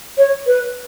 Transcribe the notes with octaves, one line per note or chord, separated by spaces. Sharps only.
C#5
B4